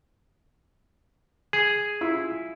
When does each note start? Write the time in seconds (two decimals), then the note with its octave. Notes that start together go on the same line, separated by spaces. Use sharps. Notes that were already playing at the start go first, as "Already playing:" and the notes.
1.53 G#4
2.01 E4 F4 E6